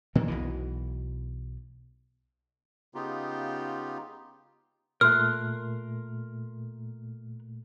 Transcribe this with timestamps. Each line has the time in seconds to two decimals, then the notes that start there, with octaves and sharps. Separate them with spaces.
0.15 A#2 D#3 A#3
0.28 B1 B2 E3
2.95 C#3 B3 D#4 F4 G4
5.01 A#2 A3 A#4 C6 F6 F#6